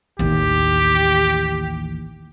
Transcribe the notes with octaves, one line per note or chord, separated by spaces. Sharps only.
A1 D#2 G4